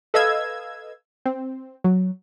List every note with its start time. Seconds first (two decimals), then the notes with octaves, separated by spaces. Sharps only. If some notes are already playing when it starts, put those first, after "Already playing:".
0.14 A4 B4 D#5 F5 E6 G#6
1.26 C4
1.84 F#3